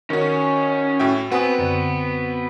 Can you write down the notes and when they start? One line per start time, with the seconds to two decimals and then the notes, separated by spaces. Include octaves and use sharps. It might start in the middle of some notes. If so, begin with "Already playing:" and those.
0.10 D#3 C#4 F#4 A#4 C#5
0.99 A2 F#4 E5 G5
1.32 B3 C4 F#4 B4 F#5 G#5 D#6
1.59 F#2 D3